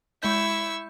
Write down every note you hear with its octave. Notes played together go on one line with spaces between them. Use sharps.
G#3 E4 C#6 E6 G6